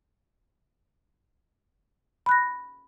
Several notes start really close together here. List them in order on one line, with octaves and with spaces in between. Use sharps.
B5 F#6 A#6